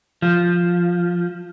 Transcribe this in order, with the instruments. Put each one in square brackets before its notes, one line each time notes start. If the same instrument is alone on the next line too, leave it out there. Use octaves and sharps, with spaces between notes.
[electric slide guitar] F3